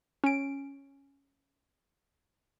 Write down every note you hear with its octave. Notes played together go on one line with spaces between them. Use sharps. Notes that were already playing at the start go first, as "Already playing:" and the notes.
C#4 D7